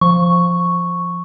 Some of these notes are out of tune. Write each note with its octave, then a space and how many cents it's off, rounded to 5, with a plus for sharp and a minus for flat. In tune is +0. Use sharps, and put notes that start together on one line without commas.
F3 +0 C#6 +0